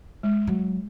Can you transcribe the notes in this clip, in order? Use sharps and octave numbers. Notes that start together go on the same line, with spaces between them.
G#3
F#3